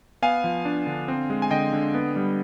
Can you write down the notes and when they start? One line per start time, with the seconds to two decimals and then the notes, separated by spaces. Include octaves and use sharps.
0.22 B3 F5 G#5
0.44 F3
0.65 D4
0.87 D3
1.08 C4
1.30 G#3
1.42 G#5
1.51 D3 D#5 G5
1.73 D3
1.94 B3
2.16 G3